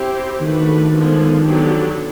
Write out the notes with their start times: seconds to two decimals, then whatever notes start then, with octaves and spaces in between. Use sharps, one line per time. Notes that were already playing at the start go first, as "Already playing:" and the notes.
Already playing: C4 E4 G4 C5
0.41 D#3 A3 D4 F#4 B4
0.92 D3 F3 G#3 B3
1.44 D3 F#3 B3 D4 G4